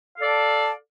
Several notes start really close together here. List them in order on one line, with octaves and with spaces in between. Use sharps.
F5 A4 D5 A5